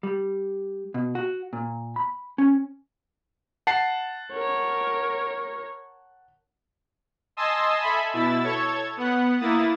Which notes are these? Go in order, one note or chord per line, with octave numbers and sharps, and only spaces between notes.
G3
B2
F#4
A#2
B5
C#4
F#5 A5 C7
A#4 C#5
D#5 G#5 A5 C6 D#6 E6
A4 E5 G#5 B5
B2 E4 E6 A6
A4 C#5 C#6 G#6
B3 F#5
A#3 E4 D#6 A6